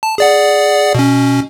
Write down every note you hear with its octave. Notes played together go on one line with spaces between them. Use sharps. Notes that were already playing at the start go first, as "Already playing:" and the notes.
A5
G#4 D5 F#5
B2 C#4